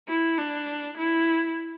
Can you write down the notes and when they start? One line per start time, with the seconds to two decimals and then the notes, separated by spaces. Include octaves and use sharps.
0.08 E4
0.38 D4
0.98 E4